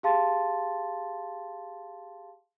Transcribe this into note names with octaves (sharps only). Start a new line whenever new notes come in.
G4 G#4 F5 A5 C6 A6